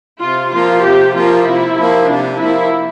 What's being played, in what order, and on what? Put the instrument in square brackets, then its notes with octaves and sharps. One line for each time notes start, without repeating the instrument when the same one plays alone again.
[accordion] C3 [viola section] F4
[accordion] F3 A#3 [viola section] F4
[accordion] C3 [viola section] G4
[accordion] F3 A#3 [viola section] F4
[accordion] C3 [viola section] E4
[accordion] F3 A#3
[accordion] C3 [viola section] D4
[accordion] F3 A#3 [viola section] E4